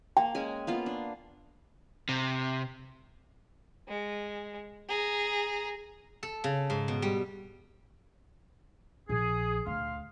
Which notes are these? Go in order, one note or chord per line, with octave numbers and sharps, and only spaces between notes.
A#3 G5
G#3 C#4 G#5
A#3 B3 F4
D4
C3
G#3
G#4 A#5
A4
C#3
G#2
B2
G3
A#1 G#4
D2 F5 C6 F6